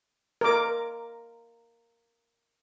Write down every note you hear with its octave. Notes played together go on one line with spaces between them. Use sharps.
A#4 D6